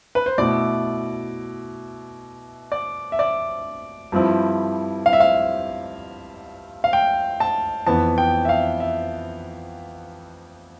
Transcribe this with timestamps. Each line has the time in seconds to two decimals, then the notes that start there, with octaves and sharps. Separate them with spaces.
0.15 B4
0.26 C5
0.38 B2 A3 E4 D5
2.72 D5
3.12 E5
3.19 D5
4.12 G2 F3 C4 E4
5.06 F5
5.13 E5
5.20 F5
6.84 F5
6.93 G5
7.40 A5
7.86 F2 E3 B3 A5
8.18 G5
8.45 E5
8.49 F5
8.80 E5